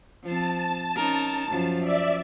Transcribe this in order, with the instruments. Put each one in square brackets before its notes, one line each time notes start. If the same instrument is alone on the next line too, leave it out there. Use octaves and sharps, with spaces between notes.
[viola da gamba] F3 C4 [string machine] A5
[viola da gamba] C#4 D#4 A#4 [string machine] A5
[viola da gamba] F#2 F3
[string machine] D5 E5